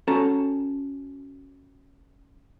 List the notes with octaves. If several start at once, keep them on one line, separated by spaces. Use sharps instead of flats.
C#4 F#4 A4 A5 A#5